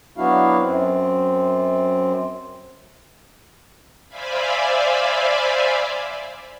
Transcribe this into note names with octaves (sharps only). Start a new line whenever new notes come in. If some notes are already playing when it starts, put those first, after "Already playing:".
F#3 B3 D4 E4 F#4 F5
F#2 C4
C5 D5 E5 F5 G#5 B5